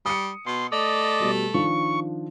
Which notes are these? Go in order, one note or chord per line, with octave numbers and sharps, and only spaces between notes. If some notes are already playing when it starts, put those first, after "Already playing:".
G3 D#6 C#7
B2 C6
A3 D5 D#5
B2 G3
D#3 F3 D4 C#6